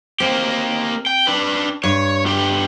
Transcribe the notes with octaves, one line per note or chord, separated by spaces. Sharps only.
A#3 C4 G4
G5
D4 B4
G2 C#5
B3 G4